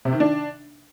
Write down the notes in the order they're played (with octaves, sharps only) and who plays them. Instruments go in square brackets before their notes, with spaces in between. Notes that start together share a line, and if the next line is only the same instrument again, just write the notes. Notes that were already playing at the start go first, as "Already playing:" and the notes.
[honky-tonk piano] C3
D#3
D4